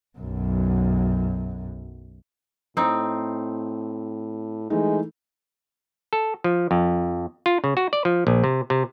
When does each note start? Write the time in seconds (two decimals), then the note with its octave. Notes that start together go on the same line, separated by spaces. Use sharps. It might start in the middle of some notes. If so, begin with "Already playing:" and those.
0.19 B1 F#2
2.77 A2 C4 D#4
4.70 E3 G#3 A3 D#4
6.13 A4
6.44 F3
6.71 F2
7.46 F4
7.64 C#3
7.77 F#4
7.93 D5
8.05 F3
8.27 A#1
8.44 C3
8.70 C3